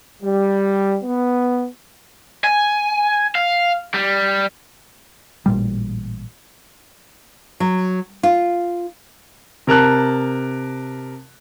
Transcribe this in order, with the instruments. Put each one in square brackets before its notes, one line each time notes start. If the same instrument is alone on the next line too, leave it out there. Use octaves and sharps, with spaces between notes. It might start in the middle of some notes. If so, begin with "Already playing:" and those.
[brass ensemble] G3
B3
[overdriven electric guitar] G#5
F5
G3
[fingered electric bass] A1 A#2 G3
[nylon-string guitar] F#3
F4
[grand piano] C3 A#4 A5 F#6